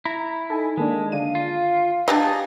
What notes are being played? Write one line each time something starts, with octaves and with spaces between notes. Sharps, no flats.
E4 A#5
D#4 A4 G#5
D#3 G#3 A#3 D4 A5
D3 D4 F5 D#7
F4
D4 D#4 G4 G#4 D#5 A5